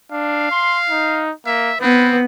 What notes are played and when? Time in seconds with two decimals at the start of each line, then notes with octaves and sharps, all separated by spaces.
0.12 D4 F5
0.52 C6
0.90 D#4
1.46 A#3 E5
1.81 B3 C4 B4